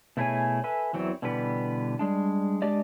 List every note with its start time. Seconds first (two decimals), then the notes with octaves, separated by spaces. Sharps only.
0.17 B2 A3 E4 G#4 C#5 G#5
0.64 A4 B4 E5 G#5
0.93 E2 E3 F#3 C4
1.22 B2 D3 E3 G3 B3 B4
1.99 G3 G#3 D4
2.62 G#3 D4 G4 D5 D#5